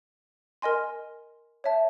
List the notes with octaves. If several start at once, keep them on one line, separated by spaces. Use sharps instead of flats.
A#4 D#5 G#5 C6
C#5 E5 A5